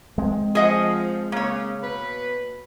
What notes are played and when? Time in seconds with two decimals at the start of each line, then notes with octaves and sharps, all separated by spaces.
0.18 G#3 C4
0.55 F3 G#4 D#5 F#5
1.32 C#3 A#3 C#5
1.83 B2 B4